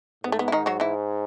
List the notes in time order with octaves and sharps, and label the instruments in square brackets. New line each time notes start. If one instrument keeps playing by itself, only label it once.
[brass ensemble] G#2 [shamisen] B3
[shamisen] A3
B3
E4
D#3 D#4
F#3 F#4
E3 E4